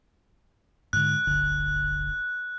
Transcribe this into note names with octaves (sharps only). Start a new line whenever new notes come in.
G#2 D3 F#6
D1 G1 D3